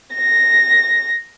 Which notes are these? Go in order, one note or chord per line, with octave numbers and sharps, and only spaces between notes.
A#6